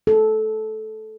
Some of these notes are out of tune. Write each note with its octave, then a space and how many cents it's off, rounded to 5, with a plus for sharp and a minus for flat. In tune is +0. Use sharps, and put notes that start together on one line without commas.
A4 -15